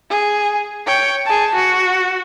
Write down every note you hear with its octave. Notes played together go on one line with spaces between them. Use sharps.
G#4
C#5 G5
G#4 A5
F#4